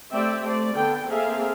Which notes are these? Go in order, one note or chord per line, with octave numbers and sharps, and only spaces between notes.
A3 C4 G4 D5 E5 G5
A3 C5 D5
D3 B3 A4 G5
A#3 C4 G#4 A4 E5 F5